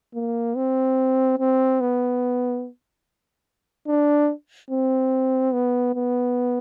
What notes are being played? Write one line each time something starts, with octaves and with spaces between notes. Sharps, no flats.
A#3
C4
C4
B3
D4
C4
B3
B3